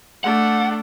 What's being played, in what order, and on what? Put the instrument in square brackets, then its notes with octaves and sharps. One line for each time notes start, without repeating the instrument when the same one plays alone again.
[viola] A3 D4 [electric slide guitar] F#5